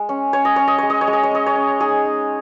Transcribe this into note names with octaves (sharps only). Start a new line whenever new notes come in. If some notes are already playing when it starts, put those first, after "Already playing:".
Already playing: G#3
C#4
C#4 C#5
D#5
C#4 C#5
D#5
G#3 C#5
D#5
C#5
G#3
D#5
C#5
C#4 D#5
C#5
C#4
D#4 G#4
D#4